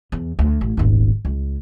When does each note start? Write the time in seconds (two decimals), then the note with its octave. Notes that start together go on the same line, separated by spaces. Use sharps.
0.12 E2
0.39 D2
0.61 A1
0.77 D#1 G#1
1.25 C#2